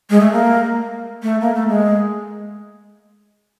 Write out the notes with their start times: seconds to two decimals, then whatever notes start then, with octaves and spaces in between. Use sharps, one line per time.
0.10 G#3
0.20 A3
0.32 A#3
1.23 A3
1.41 A#3
1.55 A3
1.68 G#3